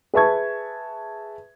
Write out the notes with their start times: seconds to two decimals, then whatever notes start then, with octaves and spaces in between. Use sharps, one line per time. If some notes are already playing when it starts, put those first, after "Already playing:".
0.14 G#4 B4 E5 A5 C#6 G#6